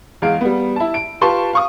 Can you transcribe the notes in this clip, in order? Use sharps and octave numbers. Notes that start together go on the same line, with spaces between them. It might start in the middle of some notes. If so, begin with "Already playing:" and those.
E2 G#3 F5 D7
G3 B3
E4 A5
D7
F4 G4 B4 A5 C6 C#6
F5 C#6 D#6